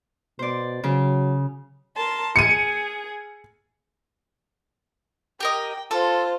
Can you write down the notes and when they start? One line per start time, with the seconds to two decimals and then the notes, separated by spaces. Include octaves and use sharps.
0.39 B2 C5 D5
0.84 C#3 F#3
1.96 A#4 A5 C6
2.36 G#4 C#7 D#7
5.40 G4 A#4 D#5 G5
5.91 F4 A4 C5